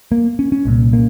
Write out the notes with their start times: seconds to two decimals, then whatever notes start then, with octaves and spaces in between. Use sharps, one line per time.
0.12 A#3
0.39 C#4
0.52 C#4
0.65 C2 A#2
0.93 A#3